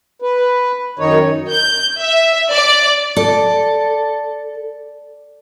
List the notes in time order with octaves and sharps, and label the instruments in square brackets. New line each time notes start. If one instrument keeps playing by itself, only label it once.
[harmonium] B4
F#2 D#3 D#4 C#5
[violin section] G6
E5
D5
[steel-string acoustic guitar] A4 [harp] D5 D6